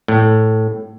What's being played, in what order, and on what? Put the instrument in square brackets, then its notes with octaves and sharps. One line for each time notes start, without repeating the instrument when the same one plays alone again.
[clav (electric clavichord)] A2